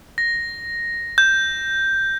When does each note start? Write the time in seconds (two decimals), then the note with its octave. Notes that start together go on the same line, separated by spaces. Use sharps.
0.18 A#6
1.18 G6